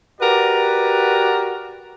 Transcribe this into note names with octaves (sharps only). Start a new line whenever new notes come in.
F#4 G4 A#4 B4 D5